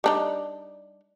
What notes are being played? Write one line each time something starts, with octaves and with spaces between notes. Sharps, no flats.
G3 D4 D#4